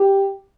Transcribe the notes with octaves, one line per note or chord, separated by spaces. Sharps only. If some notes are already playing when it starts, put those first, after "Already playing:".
Already playing: G4